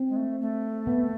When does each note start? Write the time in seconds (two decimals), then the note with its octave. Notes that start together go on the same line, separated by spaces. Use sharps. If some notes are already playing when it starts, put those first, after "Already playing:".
Already playing: C4
0.09 G#3
0.16 A3
0.41 A3
0.87 B3